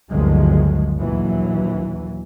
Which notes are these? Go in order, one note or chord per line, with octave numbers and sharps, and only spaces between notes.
G1 D2 D#3 F3 F#3 G#3
A#1 D#2 E3 F#3